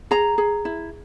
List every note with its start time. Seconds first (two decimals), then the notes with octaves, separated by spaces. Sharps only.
0.11 G#4 A#5
0.38 G#4
0.65 E4